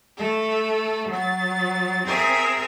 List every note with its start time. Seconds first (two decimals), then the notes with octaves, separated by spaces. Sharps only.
0.17 A3 A4
1.09 F#3 A6
2.06 C4 G#4 A#4 E5 G#6